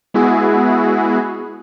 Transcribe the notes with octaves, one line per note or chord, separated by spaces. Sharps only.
G#3 B3 E4 F#4 G#4